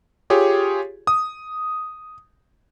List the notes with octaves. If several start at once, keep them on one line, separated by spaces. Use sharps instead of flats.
F4 G4 G#4 C#5
D#6